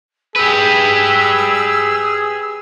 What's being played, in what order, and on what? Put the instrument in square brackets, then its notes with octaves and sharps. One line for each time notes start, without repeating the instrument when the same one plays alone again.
[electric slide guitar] G4 B4 [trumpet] G#4 [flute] E6